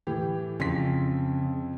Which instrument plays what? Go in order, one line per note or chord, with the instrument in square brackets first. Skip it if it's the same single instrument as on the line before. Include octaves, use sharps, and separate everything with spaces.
[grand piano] A2 E3 G4
[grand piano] F2 C6 B6 [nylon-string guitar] C#3